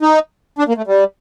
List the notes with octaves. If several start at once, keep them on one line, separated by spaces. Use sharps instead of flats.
D#4
D4
A#3
A3
G3